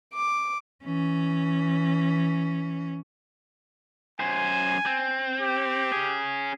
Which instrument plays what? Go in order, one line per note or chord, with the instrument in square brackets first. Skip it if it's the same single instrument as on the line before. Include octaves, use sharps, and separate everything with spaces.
[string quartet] D6
[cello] E3 C#4
[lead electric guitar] F#2 C5 [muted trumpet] G#5
[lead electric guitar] C4
[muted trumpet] G4
[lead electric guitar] C#4 G#4